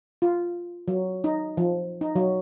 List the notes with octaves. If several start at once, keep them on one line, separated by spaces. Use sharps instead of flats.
F4
F#3
D#4
F3
D#4
F#3